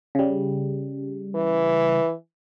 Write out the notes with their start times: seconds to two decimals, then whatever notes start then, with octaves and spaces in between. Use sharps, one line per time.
0.15 C#3 G3
1.35 E3